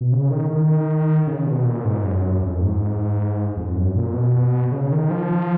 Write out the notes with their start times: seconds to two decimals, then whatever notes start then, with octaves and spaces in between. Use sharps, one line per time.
0.01 B2
0.12 C#3
0.31 D#3
0.50 D#3
1.27 C#3
1.46 B2
1.65 A#2
1.85 G#2
2.04 F#2
2.42 F2
2.61 G#2
3.57 F2
3.76 F#2
3.95 A#2
4.13 B2
4.72 C#3
4.91 D#3
5.10 F3